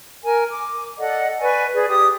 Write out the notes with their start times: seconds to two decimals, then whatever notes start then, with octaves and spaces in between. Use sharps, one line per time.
0.24 A#4 G#5
0.49 D6
0.98 A4 D5 D#5 F#5
1.39 B4 D5 G#5 C#6
1.74 G#4 B4 D5
1.88 G4 D#6